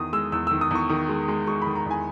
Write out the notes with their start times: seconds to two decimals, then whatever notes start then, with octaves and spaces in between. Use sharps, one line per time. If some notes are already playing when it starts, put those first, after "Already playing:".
Already playing: E2 D#3 D#6
0.13 G#3 E6
0.32 E2 E6
0.47 D#3 E6
0.61 D#6
0.71 E2 C#6
0.90 D#3
1.09 G#3
1.28 G#3
1.47 G#3 C#6
1.62 D#3 B5
1.75 A#5
1.86 E2 G#5